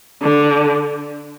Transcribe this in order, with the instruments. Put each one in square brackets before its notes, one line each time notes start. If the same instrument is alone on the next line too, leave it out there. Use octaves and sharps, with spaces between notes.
[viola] D3